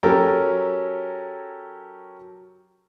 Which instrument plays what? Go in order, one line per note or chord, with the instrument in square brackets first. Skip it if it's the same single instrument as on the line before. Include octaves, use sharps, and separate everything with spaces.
[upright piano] F#3 C#4 G4 A4 A#4 C#5